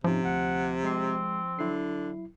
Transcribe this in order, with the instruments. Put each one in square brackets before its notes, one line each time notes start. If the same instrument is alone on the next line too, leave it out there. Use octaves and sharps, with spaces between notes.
[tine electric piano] G#2 C#4 D#4 [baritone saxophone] C3 [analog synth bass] F3
[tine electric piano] D2 [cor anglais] F#5
[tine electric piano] G#3 C7 [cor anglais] C4
[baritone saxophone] D3 [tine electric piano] F#3 E4 C7